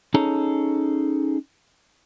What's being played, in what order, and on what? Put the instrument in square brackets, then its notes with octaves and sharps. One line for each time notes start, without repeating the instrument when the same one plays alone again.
[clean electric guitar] C#4 D#4 G#4 A4 C#5 A#5